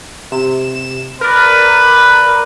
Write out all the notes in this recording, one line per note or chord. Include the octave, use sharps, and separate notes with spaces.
C3 E7
A#4 B4 D5